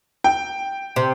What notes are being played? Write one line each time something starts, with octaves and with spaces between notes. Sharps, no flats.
G5
C3